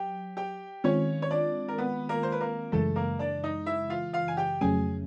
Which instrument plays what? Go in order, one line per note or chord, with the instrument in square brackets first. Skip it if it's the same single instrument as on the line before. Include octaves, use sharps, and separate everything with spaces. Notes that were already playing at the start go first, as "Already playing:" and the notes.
Already playing: [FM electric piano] F#3 [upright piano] G4 G5
[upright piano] G4 G5
[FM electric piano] D#3 G#3 C4 F4 [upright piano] C#4 C#5
[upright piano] C#5
D4 D5
A#4
B3 B4
A#3 A#4
C5
B4
A#3 A#4
[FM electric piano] F#2 C#3 E3 G#3 [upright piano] A3 A4
[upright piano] A#3 A#4
D4 D5
D#4 D#5
E4 E5
F4 F5
F4 F5
G#5
G4 G5
[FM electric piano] F2 C#3 F#3 A3 C#4 [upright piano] G#4 G#5